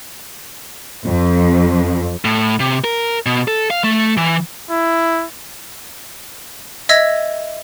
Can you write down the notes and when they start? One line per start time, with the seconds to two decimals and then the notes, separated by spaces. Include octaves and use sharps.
1.05 F2
2.25 A2
2.60 C3
2.84 A#4
3.26 B2
3.48 A4
3.70 F5
3.84 A3
4.17 E3
4.70 E4
6.89 D#5 E5 E6 G#6 A#6